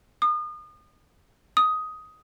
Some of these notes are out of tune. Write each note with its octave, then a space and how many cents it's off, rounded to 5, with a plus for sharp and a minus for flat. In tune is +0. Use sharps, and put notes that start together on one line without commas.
D#6 -35
D#6 +10